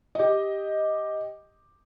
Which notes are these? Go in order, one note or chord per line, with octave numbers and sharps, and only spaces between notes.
G4 D#5